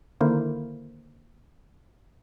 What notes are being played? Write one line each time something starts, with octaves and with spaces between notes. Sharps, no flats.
D3 D#3 A#3 E4 A#4 C5